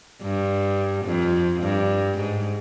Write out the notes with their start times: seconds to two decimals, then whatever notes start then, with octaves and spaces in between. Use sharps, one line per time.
0.22 G2
1.05 F2
1.62 G2
2.18 G#2